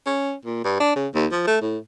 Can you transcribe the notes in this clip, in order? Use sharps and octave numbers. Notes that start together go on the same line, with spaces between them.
C#4
A#2
G2
D4
C#3
D#2
F3
A3
A2